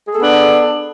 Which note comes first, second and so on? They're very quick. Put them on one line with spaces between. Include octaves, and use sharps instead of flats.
G#4 A4 B3 D4